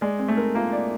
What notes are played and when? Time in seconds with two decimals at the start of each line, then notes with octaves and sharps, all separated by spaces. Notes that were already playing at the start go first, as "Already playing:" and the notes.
0.01 G#3 D5
0.19 C4
0.29 A3
0.37 A#4
0.55 A#3 F4
0.72 D5